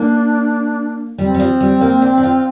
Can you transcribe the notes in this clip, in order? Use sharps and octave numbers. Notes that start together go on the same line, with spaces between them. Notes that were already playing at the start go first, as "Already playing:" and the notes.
Already playing: A#3 D4
G3 C4
G3
F3
G3
A#3
D4
D4
F4